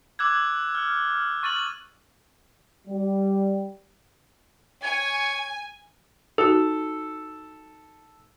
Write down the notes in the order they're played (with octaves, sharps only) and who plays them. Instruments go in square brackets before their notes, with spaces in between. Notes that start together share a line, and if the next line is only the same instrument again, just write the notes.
[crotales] D6 E6 F#6 G#6
F6
C#6 A6 D#7 F#7
[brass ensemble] G3
[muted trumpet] C#5 [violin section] G#5
[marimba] D#4 F#4 [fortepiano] A4